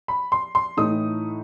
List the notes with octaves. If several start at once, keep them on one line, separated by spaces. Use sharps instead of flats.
B5
C6
C6
A2 E3 A3 D#4 D#6